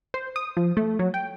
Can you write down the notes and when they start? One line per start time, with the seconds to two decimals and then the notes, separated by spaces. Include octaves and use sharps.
0.14 C5
0.36 D#6
0.57 F3
0.77 A3
0.99 F#3
1.14 G5